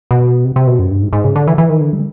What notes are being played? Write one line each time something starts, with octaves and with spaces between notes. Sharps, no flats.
B2
C3
C3
B2
F#2
G2
G#2
G#2
C#3
D3
E3
E3
D#3
D3
G3